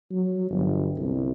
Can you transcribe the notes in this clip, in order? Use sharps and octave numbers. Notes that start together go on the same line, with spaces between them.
F#3
G1
C2